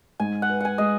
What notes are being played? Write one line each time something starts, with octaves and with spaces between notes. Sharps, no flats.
G#2 G#5
F#5
B4
F#5 G#5
G#3 D#5